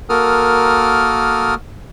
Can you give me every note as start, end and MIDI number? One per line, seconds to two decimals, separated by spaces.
0.09 1.54 58
0.09 1.54 66
0.09 1.54 69
0.09 1.54 70
0.09 1.54 87
0.09 1.54 89